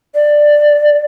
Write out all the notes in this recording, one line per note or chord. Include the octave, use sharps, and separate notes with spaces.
D5